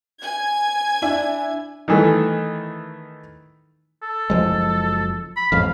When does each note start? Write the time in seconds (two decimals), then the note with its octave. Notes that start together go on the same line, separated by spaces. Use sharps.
0.21 G#5 G#6
1.02 D4 E4 E5
1.88 D#3 E3 A3
4.03 A4
4.30 F#1 F3 G#3
5.36 B5
5.52 A1 F2 G#2 F5